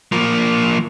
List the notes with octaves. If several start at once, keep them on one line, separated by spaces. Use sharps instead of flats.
F3 A#3